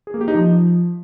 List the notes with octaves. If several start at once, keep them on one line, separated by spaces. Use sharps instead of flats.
G#4
A#3
G4
D#4
F3